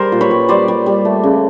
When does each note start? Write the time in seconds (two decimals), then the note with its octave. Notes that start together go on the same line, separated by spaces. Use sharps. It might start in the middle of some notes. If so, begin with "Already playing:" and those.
Already playing: G3 A#4 C5
0.12 A#2
0.21 B4 C#5
0.31 G3
0.49 G3 C5 D5
0.68 G3
0.86 G3
1.05 A3
1.23 C#3